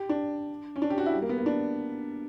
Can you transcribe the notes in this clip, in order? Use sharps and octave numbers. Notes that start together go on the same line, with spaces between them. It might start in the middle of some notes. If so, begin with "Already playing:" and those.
Already playing: G4
D4
C#4
D4
G4
F#4
E4
G3
A#3
B3
A#3
D4